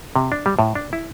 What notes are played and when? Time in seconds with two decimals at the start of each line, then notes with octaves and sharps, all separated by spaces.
0.16 C3
0.32 D4
0.46 G3
0.59 A2
0.75 D4
0.93 E4